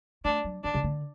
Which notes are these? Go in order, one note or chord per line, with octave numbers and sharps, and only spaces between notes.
A3 D4
F#3
D#3 D4
C3
D3